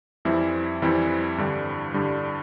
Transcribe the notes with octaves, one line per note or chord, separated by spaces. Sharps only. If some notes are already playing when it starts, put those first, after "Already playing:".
F2 E3 G3 C4 E4
F2 E3 G3 C4 E4
G2 D3 G3
G2 D3 G3